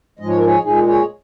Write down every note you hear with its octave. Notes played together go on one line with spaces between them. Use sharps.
G#2 F3 G#3 D#5
C#5
A#4
G#4 C#5
A#2 G#3 D#4 G#4
G#4 C#5